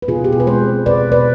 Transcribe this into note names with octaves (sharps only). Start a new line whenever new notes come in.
B4
B2 F4 G#4
G4
G#4
B4
G#3 C4 G#4 C5
B2 B4 D5
B4 D5